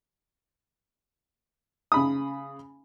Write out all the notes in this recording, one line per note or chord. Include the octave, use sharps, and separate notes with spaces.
C#3 B5 D#6